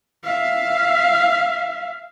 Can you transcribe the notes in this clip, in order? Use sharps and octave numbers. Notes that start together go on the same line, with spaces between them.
E5 F5